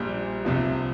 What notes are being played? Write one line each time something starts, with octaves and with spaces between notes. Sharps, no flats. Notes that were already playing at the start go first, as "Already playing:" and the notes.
Already playing: A#1 A#2 G3
C2 C3 F3